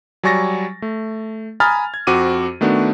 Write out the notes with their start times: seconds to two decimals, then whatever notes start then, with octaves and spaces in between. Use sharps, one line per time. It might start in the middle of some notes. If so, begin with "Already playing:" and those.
0.23 F#3 G3 G#5 C#6 A6 A#6
0.82 A3
1.60 G#5 A#5 B5 D#6 F6 A6
1.94 G#6
2.07 F2 C4 F#4 D6 D#7
2.61 D#3 A3 B3 D4 F#4